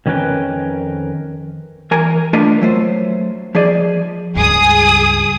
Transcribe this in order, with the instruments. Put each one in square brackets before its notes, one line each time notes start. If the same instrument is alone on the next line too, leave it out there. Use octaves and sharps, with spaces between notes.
[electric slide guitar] F2 D#3 C#4 A#4 B4 G5
[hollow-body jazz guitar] E3 A#4 G#5 A#5
A3 D4 F4 A#4 B4 D#5
F#3 A3 C5
F3 G#4 D5 D#5
[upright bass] C#2 G2 [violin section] G#4 D#6